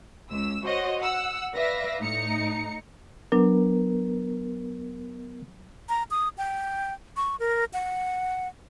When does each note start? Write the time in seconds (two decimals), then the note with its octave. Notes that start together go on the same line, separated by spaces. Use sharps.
0.30 C#2 E6
0.65 F#4 C5 C#5 D#5 F#5
1.00 F#5 E6
1.54 B4 D5 E5 F5 A#6
2.00 A2 D#4 A#5 C#7
3.32 F#3 B3 D4 A#4
5.89 A#5
6.11 D#6
6.38 G5
7.17 C#6
7.40 A#4
7.73 F#5